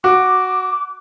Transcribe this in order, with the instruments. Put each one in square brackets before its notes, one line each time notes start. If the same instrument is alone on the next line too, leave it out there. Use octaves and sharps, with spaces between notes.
[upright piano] F#4 [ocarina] D6